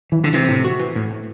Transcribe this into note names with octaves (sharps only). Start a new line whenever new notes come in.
E3
D3
C3 E3
A2
F#4
E3
A2
A2